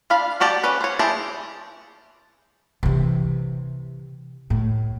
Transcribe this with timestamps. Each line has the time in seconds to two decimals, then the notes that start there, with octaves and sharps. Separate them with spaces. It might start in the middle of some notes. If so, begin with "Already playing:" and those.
0.10 D4 F4 F5 B5
0.40 A#3 F#4 G4 D5 A5
0.64 C#4 B4
0.81 C5 C#5
0.99 E4 G4 G#4 C5 A5
2.83 C3 E3
4.50 A2